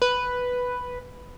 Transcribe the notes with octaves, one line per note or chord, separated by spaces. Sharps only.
B4